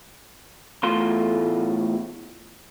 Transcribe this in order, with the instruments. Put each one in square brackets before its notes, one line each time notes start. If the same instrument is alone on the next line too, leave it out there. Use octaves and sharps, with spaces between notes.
[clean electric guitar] E2 A2 A3 F4 C6